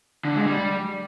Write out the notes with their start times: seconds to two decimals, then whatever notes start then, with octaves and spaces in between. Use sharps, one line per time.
0.25 D3
0.36 G#3
0.47 G3